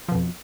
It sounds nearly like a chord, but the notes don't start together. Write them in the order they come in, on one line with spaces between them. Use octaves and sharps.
F3 B2 F2